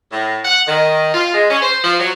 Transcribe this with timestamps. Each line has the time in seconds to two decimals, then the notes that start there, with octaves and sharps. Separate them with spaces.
0.12 A2
0.44 F#5
0.66 D#3
1.14 F4
1.33 G#3
1.50 C#4
1.63 C5
1.83 F3
1.99 F#3